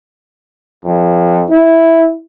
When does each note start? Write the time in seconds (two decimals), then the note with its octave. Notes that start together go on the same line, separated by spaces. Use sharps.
0.85 F2
1.49 E4